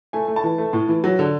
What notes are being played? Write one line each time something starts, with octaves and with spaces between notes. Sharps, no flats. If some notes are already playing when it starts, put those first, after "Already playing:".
A3 G#5
A3
A5
E3
A3
A2
E3
F#3
D3